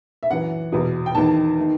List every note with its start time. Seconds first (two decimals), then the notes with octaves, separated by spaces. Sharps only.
0.23 E5
0.31 F#2 E3 F#5
0.72 E2 B2
1.06 G5
1.15 E2 D#3 A5
1.61 D#3